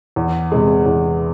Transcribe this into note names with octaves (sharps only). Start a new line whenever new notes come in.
E2
C3 E3 G#3
E2